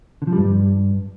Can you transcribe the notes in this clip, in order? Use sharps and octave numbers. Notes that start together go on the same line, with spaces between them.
D3
F3
G3
G2